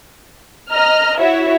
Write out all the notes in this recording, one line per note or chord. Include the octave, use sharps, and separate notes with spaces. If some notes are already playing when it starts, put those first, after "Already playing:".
D#5 A#5 F6
E4 F#4 C#5 E5